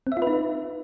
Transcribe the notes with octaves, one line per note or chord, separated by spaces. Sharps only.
C4
E5
F4
B4
D#4